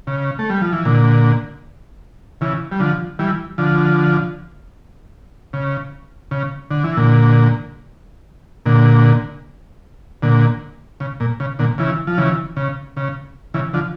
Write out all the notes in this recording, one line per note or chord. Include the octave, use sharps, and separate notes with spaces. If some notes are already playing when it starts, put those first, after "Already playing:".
C#3
A3
G3
F3
E3
A#2 D3
C#3 E3
G3
D3 F3
E3 G3
D3 F3
C#3
C#3
D3
E3
A#2 D3
A#2 D3
A#2 D3
C#3
A#2
C#3
A#2 D3
C#3 E3
F3
C#3 E3
C#3
C#3
C#3 E3
D3 F3